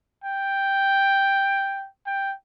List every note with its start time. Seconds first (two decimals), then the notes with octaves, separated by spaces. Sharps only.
0.24 G5
2.06 G5